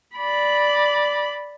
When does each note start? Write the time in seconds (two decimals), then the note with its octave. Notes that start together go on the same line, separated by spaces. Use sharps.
0.17 D5 B5